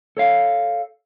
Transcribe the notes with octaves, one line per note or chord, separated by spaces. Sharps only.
A4 C#5 F5